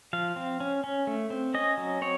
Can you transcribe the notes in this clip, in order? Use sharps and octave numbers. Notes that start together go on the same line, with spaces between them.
F3 F5
C4
C#4
C#4
A3
C4
C#4 D#5
F#3
C4 C#5